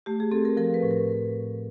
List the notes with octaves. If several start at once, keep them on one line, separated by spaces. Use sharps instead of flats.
A3 G4
G#4
C4 A4
A#4
F3 A#4
B4
A2
A#4